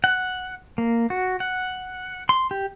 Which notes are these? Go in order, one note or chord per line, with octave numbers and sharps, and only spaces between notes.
F#5
A#3
F#4
F#5
C6
G4